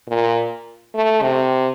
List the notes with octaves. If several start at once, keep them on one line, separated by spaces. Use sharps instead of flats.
A#2
A3
C3